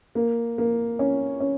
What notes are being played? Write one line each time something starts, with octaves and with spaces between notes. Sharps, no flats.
A#3
A#3
C#4
C#4